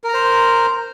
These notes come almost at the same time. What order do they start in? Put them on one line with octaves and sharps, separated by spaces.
A#4 A#5 C5